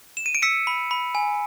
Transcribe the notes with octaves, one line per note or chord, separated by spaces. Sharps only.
E7
D#7
D7
E6 B6 C#7
B5
B5
G#5